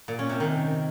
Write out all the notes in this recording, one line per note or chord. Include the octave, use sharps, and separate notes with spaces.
A#2
C#4
C3
D#3